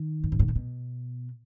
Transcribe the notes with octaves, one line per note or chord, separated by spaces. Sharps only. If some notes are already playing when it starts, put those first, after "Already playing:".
Already playing: D#3
G2
G#2
A2
A#2
B2